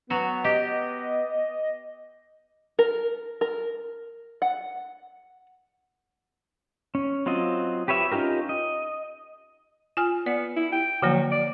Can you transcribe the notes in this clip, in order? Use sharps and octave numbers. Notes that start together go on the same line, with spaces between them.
F#3 B3 F#4
G4 D#5
A#4
A#4
F#5
C#4
F#3 C4 F4 D#5
G4 B4 C#5 E5
C#4 D#4 F4 G4 A#4
D#5
F4 G#5 F6
B3 D5
E4
G5
D3 F3 F#3 A#3
D5